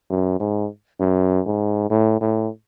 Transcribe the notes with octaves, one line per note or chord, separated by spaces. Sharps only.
F#2
G#2
F#2
G#2
A2
A2